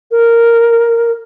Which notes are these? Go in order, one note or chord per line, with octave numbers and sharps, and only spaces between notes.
A#4